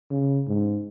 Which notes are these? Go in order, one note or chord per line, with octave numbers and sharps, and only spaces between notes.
C#3
G#2